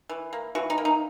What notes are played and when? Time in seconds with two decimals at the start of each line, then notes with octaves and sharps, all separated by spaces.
0.09 E3
0.33 A#3
0.55 E3 F#4
0.70 D#4
0.78 A#3
0.85 D#4